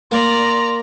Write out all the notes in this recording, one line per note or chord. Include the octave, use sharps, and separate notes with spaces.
A#3 D5 A#5 C6